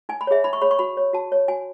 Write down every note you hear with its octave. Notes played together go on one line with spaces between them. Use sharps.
D#4 G#5
B5
G#4 C#5 E5
D#4 B5
C#6
G#4 C#5 B5
C#6
F#4 B5
C#5
F#4 A5
C#5
F#4 G#5